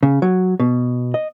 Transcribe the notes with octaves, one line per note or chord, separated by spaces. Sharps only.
C#3
F#3
B2
D#5